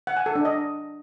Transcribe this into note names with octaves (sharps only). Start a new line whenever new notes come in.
F#5
G#5
A4
D4
D#5